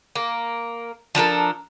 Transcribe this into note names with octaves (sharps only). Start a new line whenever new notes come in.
A#3
F3 D4 A4 A#4